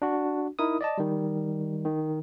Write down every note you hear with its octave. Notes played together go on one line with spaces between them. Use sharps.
D4 F#4
D#4 E4 A#4 D#6
D5 D#5 A5
D#3 G3
D#3